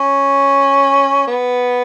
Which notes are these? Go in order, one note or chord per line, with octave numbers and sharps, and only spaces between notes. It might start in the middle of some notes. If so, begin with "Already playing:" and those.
Already playing: C#4
B3